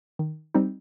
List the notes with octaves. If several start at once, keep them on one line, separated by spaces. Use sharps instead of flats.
D#3
G3 C4 D#4